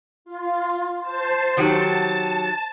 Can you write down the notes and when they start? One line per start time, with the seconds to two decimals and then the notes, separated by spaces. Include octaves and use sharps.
0.25 F4
1.01 C5 A5 C7
1.57 D#3 F#3 G4 A5